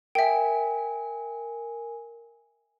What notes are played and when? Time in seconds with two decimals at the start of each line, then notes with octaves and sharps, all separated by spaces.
0.15 A#4 E5 G5 G#5